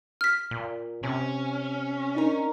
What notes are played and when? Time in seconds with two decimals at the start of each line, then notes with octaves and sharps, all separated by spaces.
0.21 F6 B6
0.51 A#2
1.03 C3 C#4
2.15 D4 D#4 A#4